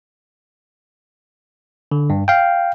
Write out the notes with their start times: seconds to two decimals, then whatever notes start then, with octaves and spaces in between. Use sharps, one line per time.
1.92 D3
2.10 G2
2.28 F5 G5